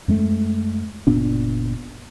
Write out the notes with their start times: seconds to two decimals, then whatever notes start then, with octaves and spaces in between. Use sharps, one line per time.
0.08 F#2 G#3 A3
1.07 F#1 A#2 B3 D4